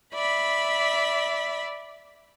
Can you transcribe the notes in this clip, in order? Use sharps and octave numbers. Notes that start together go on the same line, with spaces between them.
D5 E5 B5